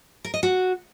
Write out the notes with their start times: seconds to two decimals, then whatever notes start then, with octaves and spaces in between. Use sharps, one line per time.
0.25 A#4
0.34 D#5
0.43 F#4